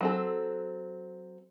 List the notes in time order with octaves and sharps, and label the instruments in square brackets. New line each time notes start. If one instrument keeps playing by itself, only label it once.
[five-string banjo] F#3 C4 A4